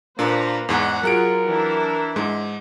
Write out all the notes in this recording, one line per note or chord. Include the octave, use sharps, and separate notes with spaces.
A#2 A#3 D4 B4 C5 A#5
E2 G#2 F#5
F#3 F4 G#4 A#4 F#5 D7
E3 D4 E4
G#2 G#3